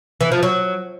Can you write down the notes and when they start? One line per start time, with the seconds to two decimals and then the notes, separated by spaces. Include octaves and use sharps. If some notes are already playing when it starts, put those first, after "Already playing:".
0.21 E3
0.32 F3
0.43 F#3